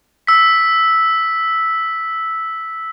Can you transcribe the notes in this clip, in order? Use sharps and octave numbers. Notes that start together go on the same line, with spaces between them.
E6 B6